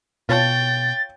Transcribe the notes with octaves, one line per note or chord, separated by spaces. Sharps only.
B2 F4 C#5 G5 A5 A6